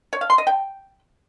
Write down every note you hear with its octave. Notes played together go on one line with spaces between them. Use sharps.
C#5
F5
C6
D#5
G5